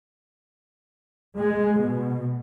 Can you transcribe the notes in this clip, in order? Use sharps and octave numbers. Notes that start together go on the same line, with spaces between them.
G#3
B2